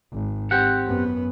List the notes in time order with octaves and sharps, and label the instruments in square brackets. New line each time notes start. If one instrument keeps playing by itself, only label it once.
[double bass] G#1
[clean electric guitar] C4 G4 F#5
[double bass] F#2 B3